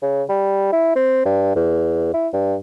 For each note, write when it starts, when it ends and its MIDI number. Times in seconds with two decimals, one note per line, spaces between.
0.02 0.23 49
0.29 0.71 55
0.72 0.91 64
0.96 1.23 60
1.26 1.52 43
1.56 2.12 40
2.14 2.28 64
2.33 2.57 43